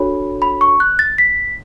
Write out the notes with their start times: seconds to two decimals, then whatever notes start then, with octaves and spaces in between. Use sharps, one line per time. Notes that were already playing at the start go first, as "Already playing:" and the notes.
Already playing: D4 F#4 A4 C#5 B5
0.42 B5
0.61 C#6
0.80 F#6
0.99 A6
1.18 B6